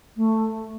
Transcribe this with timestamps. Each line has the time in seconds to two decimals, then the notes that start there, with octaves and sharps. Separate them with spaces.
0.17 A3